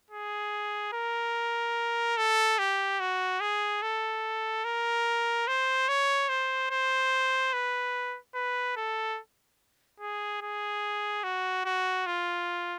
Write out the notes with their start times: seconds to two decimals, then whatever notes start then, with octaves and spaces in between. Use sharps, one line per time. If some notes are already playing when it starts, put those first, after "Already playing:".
0.11 G#4
0.93 A#4
2.17 A4
2.59 G4
3.00 F#4
3.40 G#4
3.82 A4
4.64 A#4
5.48 C5
5.89 C#5
6.29 C5
6.71 C5
7.53 B4
8.35 B4
8.76 A4
10.00 G#4
10.42 G#4
11.23 F#4
11.65 F#4
12.06 F4